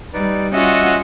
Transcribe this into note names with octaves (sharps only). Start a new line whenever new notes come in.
G3 D#4 B4 D5
C#4 F4 F#4 D#5 E5 F#5